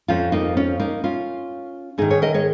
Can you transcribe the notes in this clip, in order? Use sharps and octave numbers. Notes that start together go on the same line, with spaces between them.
F2 F3 C#4 F4
A#3 D#4
C#4 F4
A#3 D#4
C#4 F4
G#2 D#3 D#4 G#4
G#4 C#5
A#4 D#5
G#4 C#5